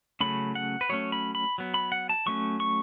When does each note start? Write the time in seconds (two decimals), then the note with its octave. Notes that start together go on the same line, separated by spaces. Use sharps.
0.21 C#3 F#3 A3 C#4 B5
0.55 F#5
0.81 B4
0.89 F#3 A3 C#4 C#5
1.12 B5
1.35 B5
1.58 F#3 B3
1.74 B5
1.92 F#5
2.09 A5
2.26 F#3 A3 C#4 C#6
2.60 C#6